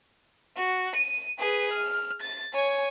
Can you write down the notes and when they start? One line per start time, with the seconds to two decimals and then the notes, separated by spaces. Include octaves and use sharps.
0.57 F#4
0.96 D#7
1.39 G#4 B4
1.73 F6
2.22 A6
2.53 C#5 G#5